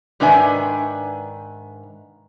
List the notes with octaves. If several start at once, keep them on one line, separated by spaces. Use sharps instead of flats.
G#2 D#3 D4 B4 E5 G#5